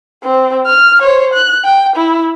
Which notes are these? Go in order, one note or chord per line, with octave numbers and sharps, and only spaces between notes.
C4
F6
C5 C#5
F#6
G5
E4